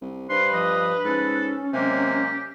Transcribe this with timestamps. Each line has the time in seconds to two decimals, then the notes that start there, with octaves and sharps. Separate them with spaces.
0.01 C2
0.29 G2 B4 C5 C6
0.53 F3 D#5
1.05 G#2 C#4 A4
1.73 C3 F#3 G#3 A#3 G4